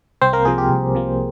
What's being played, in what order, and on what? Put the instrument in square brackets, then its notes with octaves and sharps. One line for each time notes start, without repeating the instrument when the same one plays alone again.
[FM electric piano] C2 C4 C5
A#3 A#4
C3 F3 A#3 G#4
G4
C2
C3 F3 A#3